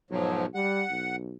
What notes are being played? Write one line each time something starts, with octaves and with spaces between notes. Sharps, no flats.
B1 G#2 F3 F#3
G3 F#5
B1